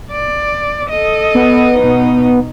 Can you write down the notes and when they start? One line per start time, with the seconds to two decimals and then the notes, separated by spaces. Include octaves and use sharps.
0.12 D5
0.90 A4 D#5
1.35 B3
1.75 B2 D#4